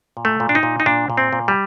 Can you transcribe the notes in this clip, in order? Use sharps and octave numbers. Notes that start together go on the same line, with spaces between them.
A#2
A3
A#2
D4
D#4
A#2
D#4
A#2 D4
A#2
C4
A#2
G3